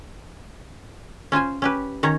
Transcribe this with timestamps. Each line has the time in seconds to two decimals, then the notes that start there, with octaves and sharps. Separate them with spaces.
1.32 C#4 F4 C5 G#5
1.62 C#4 G4 B4
2.03 D#3 C#4 C#5 A#5